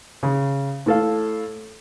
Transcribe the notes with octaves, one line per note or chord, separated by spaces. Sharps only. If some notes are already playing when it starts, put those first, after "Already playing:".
C#3
A2 A4 F5